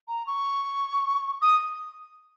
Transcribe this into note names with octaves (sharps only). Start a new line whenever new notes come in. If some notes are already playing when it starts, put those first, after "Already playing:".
A#5
C#6
D#6